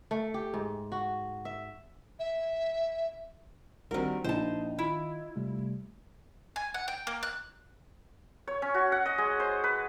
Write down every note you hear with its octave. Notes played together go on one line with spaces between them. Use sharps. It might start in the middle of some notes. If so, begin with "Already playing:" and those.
A3
G4
G#2
F#4
E5
E5
A#1 D#3 G3 C4 D4 F#4 A#4
A#1 A#3 D#4 E4 C5 A5
D#3 E4 F4
C3 G3 A3
G#5
F#5
G5
A#3
F#6
C#5
C#4
F#4
F#5
D#5
G#3
C5
B4